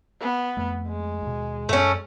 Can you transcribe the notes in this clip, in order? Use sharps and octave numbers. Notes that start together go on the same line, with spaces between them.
B3
F2 A3
G#3
D#2 B2
F#2 A3 C#4